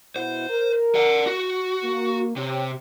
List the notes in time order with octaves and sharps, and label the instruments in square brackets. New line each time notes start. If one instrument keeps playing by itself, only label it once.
[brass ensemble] B2 E4 F#5 [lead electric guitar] C5
[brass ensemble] A#4
[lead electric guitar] D5 F#5
F#4
[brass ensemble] A#3
[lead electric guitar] C3 [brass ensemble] G4 C#5 G5